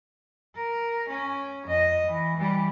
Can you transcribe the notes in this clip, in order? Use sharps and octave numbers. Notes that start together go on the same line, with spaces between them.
A#4
C#4
F2 D#5
E3
E3 G3